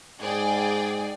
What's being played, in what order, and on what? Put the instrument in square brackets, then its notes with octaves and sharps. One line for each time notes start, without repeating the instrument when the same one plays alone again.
[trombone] G#2 [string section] G#4 D5 G5